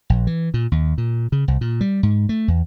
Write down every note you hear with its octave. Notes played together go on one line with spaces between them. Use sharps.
A#1
E3
A#2
D#2
A#2
C#3
C2
A#2
G3
G#2
A3
E2